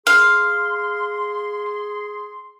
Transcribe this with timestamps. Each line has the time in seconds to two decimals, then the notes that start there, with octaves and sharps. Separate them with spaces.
0.07 G#4 F5 C6